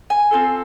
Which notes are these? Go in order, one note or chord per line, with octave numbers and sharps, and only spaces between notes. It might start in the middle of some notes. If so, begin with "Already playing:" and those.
G#5
C4 F4 A4